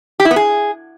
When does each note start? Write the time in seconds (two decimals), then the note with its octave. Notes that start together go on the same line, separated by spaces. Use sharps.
0.20 G4
0.25 E4
0.31 B3
0.36 G#4